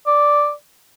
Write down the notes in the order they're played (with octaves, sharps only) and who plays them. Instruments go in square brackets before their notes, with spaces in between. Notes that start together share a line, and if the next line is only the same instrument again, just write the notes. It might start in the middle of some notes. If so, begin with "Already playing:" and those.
[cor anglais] D5